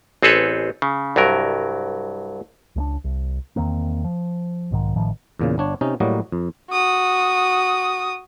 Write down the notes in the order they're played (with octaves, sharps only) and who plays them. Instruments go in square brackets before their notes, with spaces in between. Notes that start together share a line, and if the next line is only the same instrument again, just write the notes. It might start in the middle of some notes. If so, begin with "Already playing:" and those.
[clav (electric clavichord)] A1 C4 G#4 A4 B4 C#5
C#3
C2 G2 F#3 A#4
[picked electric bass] C#2 A3 D4
C2
E2 D#3 A#3 C4
F3
B1 G#2 D#3
A1 A2 D#3 F3
[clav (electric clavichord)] E2 A#2 C#3
G1 D4 C#5
C3 C#4 D#4
A2 F#3 G3 A#3 F#4 D#5
F2
[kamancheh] F#4 D#6